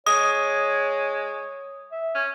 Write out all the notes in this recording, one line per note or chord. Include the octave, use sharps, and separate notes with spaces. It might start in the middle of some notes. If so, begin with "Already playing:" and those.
G#3 C#5 D#6
E5
C#4